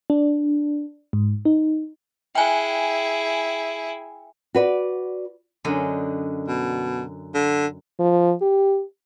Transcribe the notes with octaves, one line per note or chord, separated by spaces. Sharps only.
D4
G#2
D#4
E4 G#4 G5 G#5
F#4 B4 D5
F#2 D3 D#5
B2
D3
F3
G4